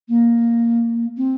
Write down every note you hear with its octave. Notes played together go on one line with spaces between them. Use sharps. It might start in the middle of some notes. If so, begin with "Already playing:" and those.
A#3
C4